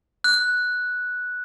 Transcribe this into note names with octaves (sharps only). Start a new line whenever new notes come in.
F#6